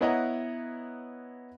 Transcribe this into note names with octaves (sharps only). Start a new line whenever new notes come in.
B3 E4 C#5 D#5 F#5 A#5